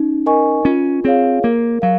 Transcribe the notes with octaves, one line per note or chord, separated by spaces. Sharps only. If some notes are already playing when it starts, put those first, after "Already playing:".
Already playing: C#4 D#4
A#4 D#5 G#5 C#6
C#4 F4
C4 G#4 C#5 F5
A#3 A#4
F#3 F5